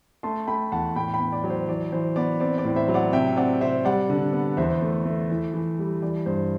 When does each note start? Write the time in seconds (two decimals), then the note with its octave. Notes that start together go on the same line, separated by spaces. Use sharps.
0.23 A3 A5 C6
0.47 A3 G5 B5
0.72 E2 F#5 A5
0.96 A2 G5 B5
1.14 G5 B5
1.19 B3
1.32 D5
1.44 F#3
1.50 C5
1.68 E3 D5
1.92 E3 C5
2.16 B3 D5
2.40 C4 D5
2.58 D5
2.64 A2
2.76 C5 E5
2.88 F#3
2.94 D5 F#5
3.13 C3 E5 G5
3.37 C4 D5 F#5
3.61 C3 C5 E5
3.85 G3 D5 F#5
4.10 D3
4.33 B3
4.57 E2 C5 E5
4.82 A3
5.05 A3
5.30 E3
5.54 E3
5.79 G3
6.02 E3 D5
6.26 G2 C5